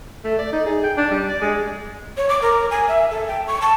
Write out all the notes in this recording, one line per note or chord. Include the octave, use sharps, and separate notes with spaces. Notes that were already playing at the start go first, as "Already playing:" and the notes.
A3
D5
D#4
G#4
G5
D4
G3
D5
G#3
C#5
D6
A#4
G#5
E5
A4
G5
C#6
A5